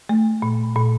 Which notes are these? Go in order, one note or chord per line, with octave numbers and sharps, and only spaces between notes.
A3
A#2
A#2